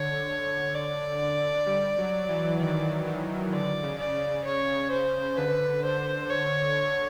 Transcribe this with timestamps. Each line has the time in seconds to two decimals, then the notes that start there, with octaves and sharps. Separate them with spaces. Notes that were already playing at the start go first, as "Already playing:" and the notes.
Already playing: D3 C#5
0.75 D5
1.66 G3
1.98 F#3
2.28 E3
2.59 D#3 D5
3.06 D#3
3.52 D3 D5
3.83 C#3
3.98 D5
4.14 C#3
4.44 C#3 C#5
4.91 C#3 C5
5.37 D3 B4
5.83 D3 C5
6.30 C#5